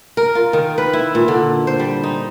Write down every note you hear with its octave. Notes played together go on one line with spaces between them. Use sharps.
A#4
F4
D#3
B4
E4
A#2
D3
C5
G3
D#4